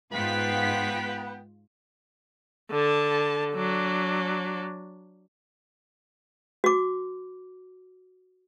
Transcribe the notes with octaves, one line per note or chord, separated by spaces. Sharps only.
G#2 B3 F4 B4 G5 B6
D3 A5
F#3 D4
F#4 D6